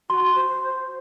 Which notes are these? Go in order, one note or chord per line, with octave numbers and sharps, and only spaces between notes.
F#4 C6
C5